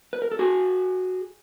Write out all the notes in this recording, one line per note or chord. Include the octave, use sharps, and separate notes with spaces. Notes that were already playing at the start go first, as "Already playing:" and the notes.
B4
A#4
A4
F#4 G#4